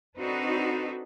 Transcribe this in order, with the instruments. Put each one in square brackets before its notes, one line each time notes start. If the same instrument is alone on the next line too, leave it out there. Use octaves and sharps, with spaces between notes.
[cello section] C4 D4 D#4 F#4 A4 B4